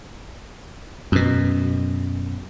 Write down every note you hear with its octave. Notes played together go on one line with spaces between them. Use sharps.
F#2 B2